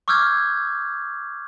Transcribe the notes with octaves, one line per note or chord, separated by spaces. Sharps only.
C#6 D6 E6 F6 G6 G#6